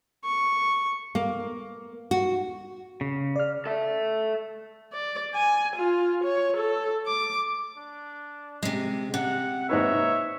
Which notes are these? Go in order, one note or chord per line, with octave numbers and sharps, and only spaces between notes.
C#6
A#3
F#4
C#3
D5 F6
A4 E5
D5
G#5
F4
C#5
A4
D6
D4
C3 G#3
C3 F#5
G#2 D#4 B4 C#5 E5